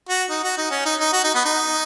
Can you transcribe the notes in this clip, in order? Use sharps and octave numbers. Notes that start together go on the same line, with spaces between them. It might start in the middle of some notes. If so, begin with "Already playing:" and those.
F#4
D#4
F#4
D#4
C#4
D#4
D#4
F#4
D#4
B3
D#4